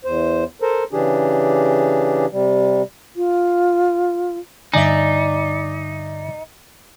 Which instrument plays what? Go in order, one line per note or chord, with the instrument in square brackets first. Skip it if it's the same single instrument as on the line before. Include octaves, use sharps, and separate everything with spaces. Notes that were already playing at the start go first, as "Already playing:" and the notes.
[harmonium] E2 C5
A4 A#4 C5
C#3 E3 D4 G4 G#4
C3 G3
[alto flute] F4
[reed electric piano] G2 D3 G#5 [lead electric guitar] D#4 [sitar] D5 E5